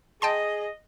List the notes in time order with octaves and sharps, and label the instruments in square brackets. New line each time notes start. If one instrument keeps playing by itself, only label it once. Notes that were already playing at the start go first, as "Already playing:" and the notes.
[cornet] G#4 [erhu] D#5 [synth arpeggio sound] G5 A5 C6